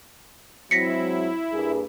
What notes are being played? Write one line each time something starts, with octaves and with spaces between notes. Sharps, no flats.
F#3 G#3 C4 E4 A#6 B6 C#7
G2 A#3 G#4 B4